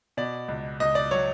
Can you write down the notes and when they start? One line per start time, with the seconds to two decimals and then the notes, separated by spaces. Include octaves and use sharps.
0.17 B2 D5
0.48 C#2
0.80 C#2 D#5
0.95 D5
1.11 F#3 C#5